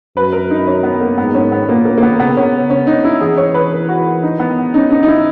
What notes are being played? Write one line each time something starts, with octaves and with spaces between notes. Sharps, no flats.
F#2 B4
A#4
D#4
C#4
B3
A#3
G#2 B3
C#4
B3
A#2 A#3
A#3
A#3
B3
C#3 B3
C#4
C#4
D#4
E4
E3 G#4
C#5
B4
A#4
F#4
D#4
B3
C#4 D#4
D#4
D#4
E4